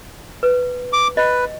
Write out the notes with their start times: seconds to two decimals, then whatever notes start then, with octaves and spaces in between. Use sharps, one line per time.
0.43 B4
0.93 D6
1.17 B4 D#5